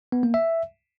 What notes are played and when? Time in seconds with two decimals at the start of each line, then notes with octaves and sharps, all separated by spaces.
0.12 B3
0.23 A#3
0.34 E5